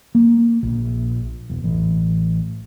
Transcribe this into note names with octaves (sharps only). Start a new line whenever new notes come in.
A#3
A#1
E1
A1